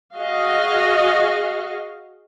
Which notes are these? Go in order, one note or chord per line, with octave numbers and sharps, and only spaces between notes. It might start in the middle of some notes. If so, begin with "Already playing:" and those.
F#4 G#4 D#5 F5